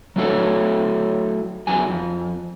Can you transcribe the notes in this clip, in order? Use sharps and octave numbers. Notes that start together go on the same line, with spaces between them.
F#3 A3 E4 F#4 A4 C#5
E2 E3 F#3 G#5
F2